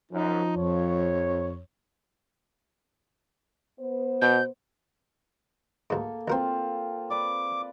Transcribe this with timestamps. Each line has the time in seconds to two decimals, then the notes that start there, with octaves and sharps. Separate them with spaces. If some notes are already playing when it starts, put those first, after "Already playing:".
0.12 F#2 F3 D#4
0.57 F2 C#5
3.80 B3 C5
4.21 B2 G6
5.90 D2 G#2 A#3 A4
6.28 D2 C4 F4 A#4 C5
7.10 B4 D5 D6